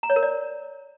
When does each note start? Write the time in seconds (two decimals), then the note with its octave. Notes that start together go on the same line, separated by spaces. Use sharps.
0.03 A#5
0.10 C#5
0.16 A#4
0.23 D5